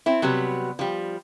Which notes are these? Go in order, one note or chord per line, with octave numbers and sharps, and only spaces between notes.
C4 E4
C3 F#3 G3 B3
F3 G3